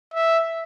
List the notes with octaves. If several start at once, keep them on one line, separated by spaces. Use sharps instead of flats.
E5